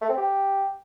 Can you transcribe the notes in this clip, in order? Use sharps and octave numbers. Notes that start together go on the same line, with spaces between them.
A3
C4
G4